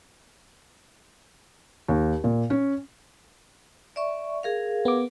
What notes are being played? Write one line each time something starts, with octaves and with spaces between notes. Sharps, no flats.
D#2
A#2
C#4
D5 E5 C#6
G#4 A#4 F5
B3 D6